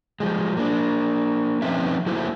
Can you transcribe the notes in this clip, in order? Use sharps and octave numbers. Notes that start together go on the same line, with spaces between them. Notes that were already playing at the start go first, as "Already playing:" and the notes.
F3 G3 G#3
A#3 D4
F3 C4 C#4 D#4 B4 E5
F#3 A3 A#3 E4 C5